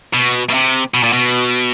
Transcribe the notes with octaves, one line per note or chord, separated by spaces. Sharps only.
B2
B2
C3
B2
A#2
B2